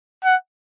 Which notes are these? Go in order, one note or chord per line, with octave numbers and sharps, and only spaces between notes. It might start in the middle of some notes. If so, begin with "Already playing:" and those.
F#5